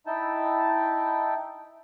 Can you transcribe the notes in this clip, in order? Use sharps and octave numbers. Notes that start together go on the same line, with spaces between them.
D#4 E4 G5 A5